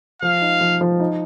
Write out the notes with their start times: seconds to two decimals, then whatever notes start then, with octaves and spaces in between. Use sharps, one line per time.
0.22 F3 F5
0.42 D#4
0.61 F3
0.81 F3
1.00 D#4